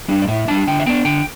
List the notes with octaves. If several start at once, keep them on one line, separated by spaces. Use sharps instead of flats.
G3 D4
D5
A2 E5
G3 D4 A5
D3 G5
E5
B3 D4 G5
D3 G5